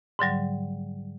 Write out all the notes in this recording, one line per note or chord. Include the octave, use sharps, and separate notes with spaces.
G#2 D3 F#3 G3